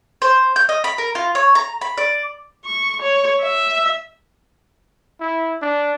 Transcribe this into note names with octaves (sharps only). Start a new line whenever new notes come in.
C5
G6
D#5
B5
A#4
F4
C#5
A#5
B5
D5
C#6
C#5
E5
E4
D4